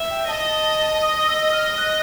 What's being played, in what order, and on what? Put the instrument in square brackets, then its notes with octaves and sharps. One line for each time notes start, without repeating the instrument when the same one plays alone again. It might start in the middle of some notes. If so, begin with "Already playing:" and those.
Already playing: [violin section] E5
[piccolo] G5
[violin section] D#5 [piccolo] A5
[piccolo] D#6
E6
F6
F#6